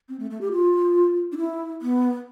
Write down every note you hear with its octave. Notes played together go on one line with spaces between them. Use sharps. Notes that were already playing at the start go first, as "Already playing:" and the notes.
C4
A3
A3
G4
F4
D4
E4
B3